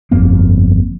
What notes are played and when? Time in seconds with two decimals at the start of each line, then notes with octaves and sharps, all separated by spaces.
0.11 G1 F2 A#3 C4